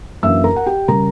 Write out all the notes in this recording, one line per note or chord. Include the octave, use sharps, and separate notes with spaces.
F#2 E3 A#3 D4 E5 E6
A#4 A#5
F#5
G4 G5
C#3 G3 A#4 A#5